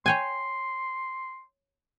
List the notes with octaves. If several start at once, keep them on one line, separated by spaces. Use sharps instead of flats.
C#5 G5 G#5 C6